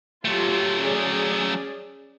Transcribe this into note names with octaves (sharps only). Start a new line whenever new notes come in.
F#3 A3 F4 G4
C#4 G#4 D5